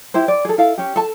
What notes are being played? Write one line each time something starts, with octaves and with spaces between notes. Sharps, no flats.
E4 G4 C5
D5
G#4 A4
E4 A4 F5
C#4 G4
A4 A5